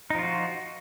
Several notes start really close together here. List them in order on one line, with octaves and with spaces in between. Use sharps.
D#4 F3 F4 F#4